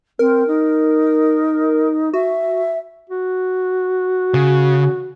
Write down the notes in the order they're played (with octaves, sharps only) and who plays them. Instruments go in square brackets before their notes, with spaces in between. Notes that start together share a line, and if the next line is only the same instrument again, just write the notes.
[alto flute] C4 [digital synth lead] A#4
[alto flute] D#4
[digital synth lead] F#4 [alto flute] E5
[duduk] F#4
[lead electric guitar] C#3